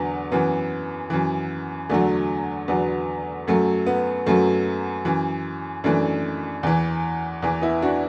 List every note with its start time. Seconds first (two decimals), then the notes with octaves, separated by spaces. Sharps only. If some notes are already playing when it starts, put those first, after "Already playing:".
Already playing: E2 D3 F#3 B3
0.32 F#2 E3 B3
1.10 F#2 E3
1.89 E2 D3 F#3 A3
2.68 E2 D3 F#3 B3
3.47 F#2 F#3 A3
3.86 B3
4.26 F#2 F#3 A3
5.05 F#2 E3
5.84 F#2 E3 A3 D4
6.63 E2 E3
7.42 E2 E3
7.62 B3 E4
7.82 D4 F#4